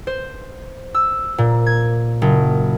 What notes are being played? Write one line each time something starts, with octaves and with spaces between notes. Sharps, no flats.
C5
E6
A#2
G#6
F#1